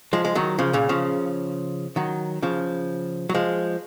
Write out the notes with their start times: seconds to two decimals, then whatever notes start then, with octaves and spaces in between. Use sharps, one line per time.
0.13 F3 G#3
0.25 G#3
0.35 D#3 F#3
0.58 C#3 F3
0.73 A#2 C#3
0.89 C#3 F3
1.96 D#3 F#3
2.42 C#3 F3
3.29 F#3
3.35 F3 G#3